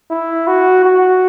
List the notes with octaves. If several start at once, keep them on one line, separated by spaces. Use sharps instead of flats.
E4
F#4
F#4